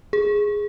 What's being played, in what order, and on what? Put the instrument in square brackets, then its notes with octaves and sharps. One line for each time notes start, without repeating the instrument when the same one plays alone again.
[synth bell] G#4